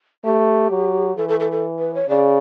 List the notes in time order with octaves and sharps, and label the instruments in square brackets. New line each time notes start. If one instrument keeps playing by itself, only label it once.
[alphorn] A3 [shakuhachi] G4
[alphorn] F#3
[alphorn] E3 [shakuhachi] A4
[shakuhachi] A4
A4
A4
B4
C#5
[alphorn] C#3 [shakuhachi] D5